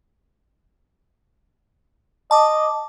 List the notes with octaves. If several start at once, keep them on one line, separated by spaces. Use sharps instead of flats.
D#5 A5 D6